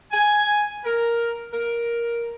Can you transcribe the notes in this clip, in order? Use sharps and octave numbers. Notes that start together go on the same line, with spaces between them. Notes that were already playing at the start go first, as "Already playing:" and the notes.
G#5
A#4
A#4